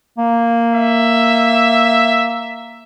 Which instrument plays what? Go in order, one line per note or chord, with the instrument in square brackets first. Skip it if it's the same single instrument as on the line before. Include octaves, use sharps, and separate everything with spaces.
[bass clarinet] A#3
[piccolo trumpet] E5